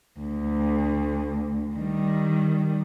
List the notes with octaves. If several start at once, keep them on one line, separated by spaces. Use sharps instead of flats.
D2
D#3 G3